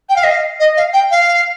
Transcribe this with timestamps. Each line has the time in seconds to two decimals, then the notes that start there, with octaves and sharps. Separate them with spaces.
0.09 G5
0.16 F5
0.23 D#5
0.31 F5
0.60 D#5
0.77 F5
0.93 G5
1.11 F5